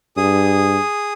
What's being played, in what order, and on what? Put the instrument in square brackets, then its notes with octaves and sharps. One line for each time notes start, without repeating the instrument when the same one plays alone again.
[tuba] G2 [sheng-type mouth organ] G#4 D#6